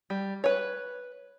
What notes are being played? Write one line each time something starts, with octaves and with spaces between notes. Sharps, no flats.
G3
B4 C#5